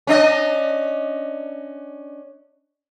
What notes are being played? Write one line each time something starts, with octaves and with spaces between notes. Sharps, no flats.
C#4 D4 D#5